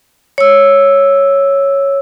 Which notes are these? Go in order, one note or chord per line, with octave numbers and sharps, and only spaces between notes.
C#5 E6